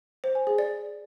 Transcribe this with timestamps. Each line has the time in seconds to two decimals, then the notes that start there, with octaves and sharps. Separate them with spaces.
0.24 C5
0.35 G#5
0.47 G#4
0.58 D5